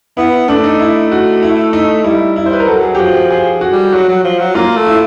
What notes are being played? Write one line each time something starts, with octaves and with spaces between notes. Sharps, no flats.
B3 E4
A3 D4
D#4
E4
F#4
E4
D#4
G3 E4
E4
C5
B4
A#4
F#3 A4
G#4
G4
F3 F#4
G4
F3 G#4
F#4
G3
F#3 F#4
F#3
F3
F#3
A#3 F4
A3
E4